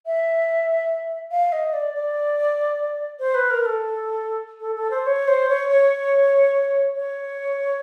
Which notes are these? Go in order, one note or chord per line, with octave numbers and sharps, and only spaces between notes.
E5
F5
D#5
D5
D5
C5
B4
A#4
A4
A4
A4
C5
C#5
C5
C#5
C#5
C#5